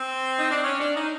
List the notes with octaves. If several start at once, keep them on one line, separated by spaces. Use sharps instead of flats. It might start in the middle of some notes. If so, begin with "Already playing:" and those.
Already playing: C4
D#4
D4
C#4
D4
D#4